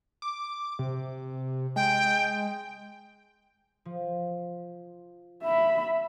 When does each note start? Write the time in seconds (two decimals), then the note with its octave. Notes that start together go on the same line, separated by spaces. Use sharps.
0.22 D6
0.79 C3
1.76 G#3 G5
3.85 F3
5.43 E5 B5